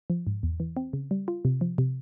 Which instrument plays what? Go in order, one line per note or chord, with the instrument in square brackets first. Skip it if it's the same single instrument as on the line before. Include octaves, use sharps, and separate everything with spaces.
[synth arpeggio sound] F3
G#2
E2
E3
C4
C#3
G3
F4
C3
F3
C3